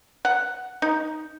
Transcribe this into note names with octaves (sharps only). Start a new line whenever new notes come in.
F#5
D#4